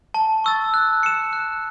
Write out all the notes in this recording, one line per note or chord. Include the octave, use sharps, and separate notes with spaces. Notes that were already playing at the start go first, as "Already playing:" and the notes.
A5
C#6 E6 A6
F#6
C#7 E7
F#6